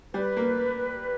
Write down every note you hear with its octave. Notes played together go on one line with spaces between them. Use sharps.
G3 B4
A#3